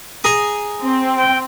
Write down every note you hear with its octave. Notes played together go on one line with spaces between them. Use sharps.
G#4 A#5 D#6
C4
G5